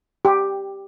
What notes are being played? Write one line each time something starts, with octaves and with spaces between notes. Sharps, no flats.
G4